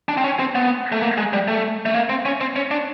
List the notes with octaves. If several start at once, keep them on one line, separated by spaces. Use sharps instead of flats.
D4
C4
C#4
C4
B3
A3
A#3
G#3
G3
A3
A3
A#3
C4
C#4
C4
C#4
D4